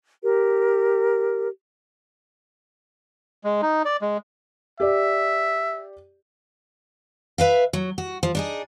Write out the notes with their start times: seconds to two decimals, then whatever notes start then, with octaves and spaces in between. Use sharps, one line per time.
0.23 G4 A#4
3.44 G#3
3.62 D#4
3.85 D5
4.02 G#3
4.80 G4 D5 E5
7.38 B4 E5 F5
7.73 F#3
7.98 F#4
8.23 F3
8.35 D4 D#4 G#4